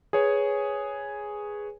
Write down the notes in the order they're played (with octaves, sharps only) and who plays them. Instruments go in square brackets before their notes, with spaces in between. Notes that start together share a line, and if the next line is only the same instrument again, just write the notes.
[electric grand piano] G#4 B4 C#5 G#5